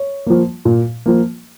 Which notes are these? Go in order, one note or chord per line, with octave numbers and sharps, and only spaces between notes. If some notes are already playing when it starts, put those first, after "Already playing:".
Already playing: C#5
F3 A#3
A#2
F3 A#3